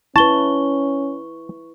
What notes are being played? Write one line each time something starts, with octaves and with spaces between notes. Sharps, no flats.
C#4 E4 B4 A5 C#6 G7